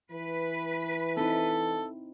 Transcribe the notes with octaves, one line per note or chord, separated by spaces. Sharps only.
E3 B4
C4 D#4 E4 A4